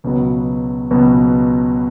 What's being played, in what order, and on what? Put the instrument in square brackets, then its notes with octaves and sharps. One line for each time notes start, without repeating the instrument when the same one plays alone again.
[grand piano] C#2 B2 F#3 B3
C#2 B2 F#3 B3